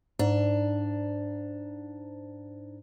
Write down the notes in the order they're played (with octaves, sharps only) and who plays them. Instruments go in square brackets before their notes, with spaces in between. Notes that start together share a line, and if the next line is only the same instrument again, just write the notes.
[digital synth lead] G#2 [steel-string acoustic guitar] D4